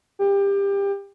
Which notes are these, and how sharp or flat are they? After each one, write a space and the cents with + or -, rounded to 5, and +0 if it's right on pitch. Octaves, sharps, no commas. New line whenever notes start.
G4 +25